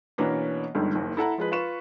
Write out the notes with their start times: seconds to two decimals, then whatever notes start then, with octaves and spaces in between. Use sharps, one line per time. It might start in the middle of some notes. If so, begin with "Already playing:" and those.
0.18 B2 E3 A#3 B3 C#4 D4
0.75 G1 C#2 G2 D3 D#3
0.95 F#1 D#2
1.17 E4 A4 F#5 A#5
1.38 F3 G#3 B4
1.52 F4 B4 C#6 E7